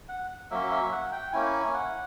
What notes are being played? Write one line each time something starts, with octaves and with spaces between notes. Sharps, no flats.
F#5
F#3 A#3 C#4 E5
E5
F#5
G5
A#3 C#4 E4 G#5
F#5